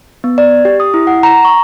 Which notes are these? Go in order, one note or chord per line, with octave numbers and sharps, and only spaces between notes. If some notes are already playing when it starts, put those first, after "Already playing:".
B3
D5
G4
D#6
E4
F#5
A#5
C#6